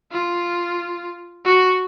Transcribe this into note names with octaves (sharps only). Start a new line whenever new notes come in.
F4
F#4